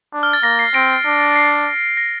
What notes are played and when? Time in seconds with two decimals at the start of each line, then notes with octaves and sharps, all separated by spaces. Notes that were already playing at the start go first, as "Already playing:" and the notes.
0.13 D4
0.23 F6
0.33 A6
0.43 A#3 A#6
0.59 C7
0.74 C4 A#6 D7
1.06 D4
1.36 C7
1.97 A#6